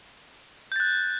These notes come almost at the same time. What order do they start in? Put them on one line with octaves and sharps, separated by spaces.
G6 A6 F#6